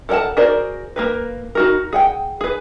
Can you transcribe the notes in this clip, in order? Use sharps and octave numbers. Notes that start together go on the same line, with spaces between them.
A4 A#4 D5 F#5 A5
F#4 G#4 A#4 C5 D5
A#3 A#4 B4
D#4 F#4 A#4
G#4 F#5 G5
G#4 B4